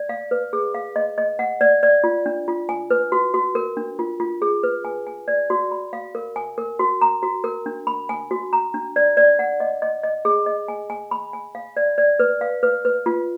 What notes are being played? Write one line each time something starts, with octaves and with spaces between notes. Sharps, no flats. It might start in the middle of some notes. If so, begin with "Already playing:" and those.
Already playing: D5
F5
B4
G#4
F5
D#5
D#5
F#5
D5
D5
F4
D4
F4
G#5
B4
F#4
F#4
A#4
D4
F4
F4
G#4
B4
G#5
G#5
D5
F#4
B5
F5
A#4
G#5
A#4
F#4
A#5
F#4
A#4
D4
B5
G#5
F#4
A#5
D4
D5
D5
F#5
D#5
D#5
D#5
G#4
D#5
G#5
G#5
B5
G#5
F5
D5
D5
B4
F5
B4
B4
F4